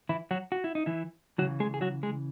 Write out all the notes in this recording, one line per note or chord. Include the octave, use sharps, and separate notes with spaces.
E3 E4
F#3 F#4
F#4
E4
D#4
E3 E4
C#3 E3 F#3 F#4
G#3 G#4
G#4
F#3 F#4
G#3 G#4